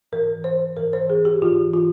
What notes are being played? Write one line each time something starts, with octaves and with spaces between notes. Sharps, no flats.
G#2 E3 A#4
C5
G#2 E3 A#4
C5
G#4
G4
G#2 E3 F4
F4